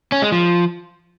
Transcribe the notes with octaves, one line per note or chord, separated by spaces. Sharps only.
C#4
G#3
F3